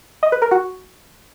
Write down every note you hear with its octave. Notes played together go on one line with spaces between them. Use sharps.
D#5
B4
A#4
F#4